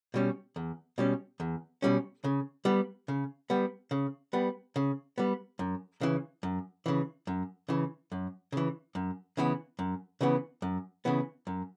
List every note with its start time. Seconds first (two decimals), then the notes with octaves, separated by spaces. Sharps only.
0.14 B2 G3 C#4
0.56 E2
0.98 B2 G3 C#4
1.40 E2
1.82 B2 G3 C#4
2.24 C#3
2.65 G3 B3
3.08 C#3
3.50 G3 B3
3.91 C#3
4.33 G3 B3
4.76 C#3
5.18 G3 B3
5.59 F#2
6.01 C#3 E3
6.43 F#2
6.86 C#3 E3
7.27 F#2
7.69 C#3 E3
8.12 F#2
8.52 C#3 E3
8.95 F#2
9.37 C#3 E3 B3
9.79 F#2
10.21 C#3 E3 B3
10.62 F#2
11.05 C#3 E3 B3
11.47 F#2